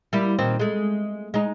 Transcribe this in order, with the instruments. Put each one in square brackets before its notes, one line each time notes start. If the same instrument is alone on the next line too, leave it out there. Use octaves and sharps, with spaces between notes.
[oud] G3 A#3 E4
A#2 D#3 C4
G#3 A3
G#3 D#4